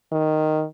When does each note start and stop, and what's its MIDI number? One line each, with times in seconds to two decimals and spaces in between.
0.12 0.64 51